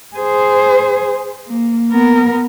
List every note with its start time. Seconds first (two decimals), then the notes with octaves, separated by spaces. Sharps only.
0.16 G#4 C5
1.47 A#3
1.91 B3 A#4